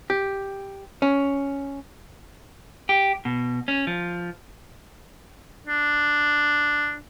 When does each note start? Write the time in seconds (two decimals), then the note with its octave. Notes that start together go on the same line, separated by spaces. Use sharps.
0.10 G4
1.02 C#4
2.89 G4
3.25 B2
3.68 C#4
3.87 F3
5.67 D4